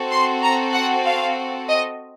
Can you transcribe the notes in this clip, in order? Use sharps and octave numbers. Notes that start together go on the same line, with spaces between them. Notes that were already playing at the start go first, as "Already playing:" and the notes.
Already playing: C4 F#4 A4
C6
A#5
F#5
F5
D#5